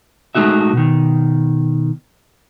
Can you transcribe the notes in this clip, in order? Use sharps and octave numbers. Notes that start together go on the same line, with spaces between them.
G#3 A3 D#4 F#4 E5
B2 D#3